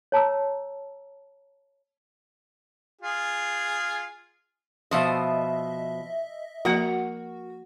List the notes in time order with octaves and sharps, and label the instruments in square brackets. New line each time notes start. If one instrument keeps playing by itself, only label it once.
[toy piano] C#5 A5 A#5 E6
[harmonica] F4 G#4
[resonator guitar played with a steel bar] B2 F3 C5 [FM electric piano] D#5 E5
[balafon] F3 A#3 [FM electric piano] F#4 [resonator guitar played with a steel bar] A#4 F#5